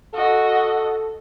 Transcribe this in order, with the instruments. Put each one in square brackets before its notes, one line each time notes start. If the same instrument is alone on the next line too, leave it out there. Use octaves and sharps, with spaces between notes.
[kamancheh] F#4 D#5 [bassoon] A4